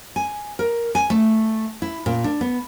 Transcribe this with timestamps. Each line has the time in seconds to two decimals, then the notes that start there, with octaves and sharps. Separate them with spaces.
0.16 G#5
0.59 A#4
0.95 G#5
1.10 A3
1.82 E4
2.06 A#2
2.24 D4
2.41 B3